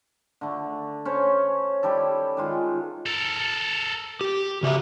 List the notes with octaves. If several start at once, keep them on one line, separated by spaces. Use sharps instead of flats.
D3 A3
C#4 C5 C#5
G3 E4 G4 A4
D#3 G#3 F4
A4 A#4
G4
C#3 F#4 D#5 E5